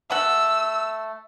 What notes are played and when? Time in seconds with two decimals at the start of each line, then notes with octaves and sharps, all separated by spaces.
0.11 A3 F#5 E6